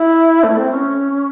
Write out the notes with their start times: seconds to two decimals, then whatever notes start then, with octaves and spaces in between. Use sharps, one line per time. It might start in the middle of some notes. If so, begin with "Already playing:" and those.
Already playing: E4
0.44 A3
0.57 C4
0.71 C#4